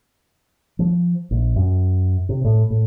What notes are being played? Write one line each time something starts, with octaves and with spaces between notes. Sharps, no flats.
F3
A#1
F#2
C3
A2
A2